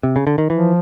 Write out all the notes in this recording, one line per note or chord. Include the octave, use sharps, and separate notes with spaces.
C3
C#3
D3
D#3
E3 F3